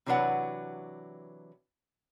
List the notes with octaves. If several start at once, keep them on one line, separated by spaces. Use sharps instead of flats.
C3 E3 F#3 D4 B4 F#5